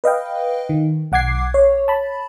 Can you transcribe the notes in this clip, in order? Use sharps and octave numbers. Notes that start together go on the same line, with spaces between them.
B4 D#5 F5 G5
D#3
B1 F#5 D6 G#6 C7
C#5
A5 B5